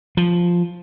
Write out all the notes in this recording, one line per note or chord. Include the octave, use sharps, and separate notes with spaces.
F3